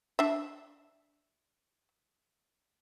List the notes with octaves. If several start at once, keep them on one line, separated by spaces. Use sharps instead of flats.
D4 E5